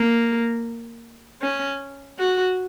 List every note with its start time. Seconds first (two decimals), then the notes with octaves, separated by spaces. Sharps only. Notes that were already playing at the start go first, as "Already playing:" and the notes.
Already playing: A#3
1.41 C#4
2.19 F#4